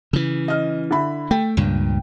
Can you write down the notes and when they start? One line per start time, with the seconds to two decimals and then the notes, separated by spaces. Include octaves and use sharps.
0.13 C#3 E3
0.48 D#5 F6
0.91 D3 E4 B5
1.31 A3 G5
1.57 C#2 G2 A#2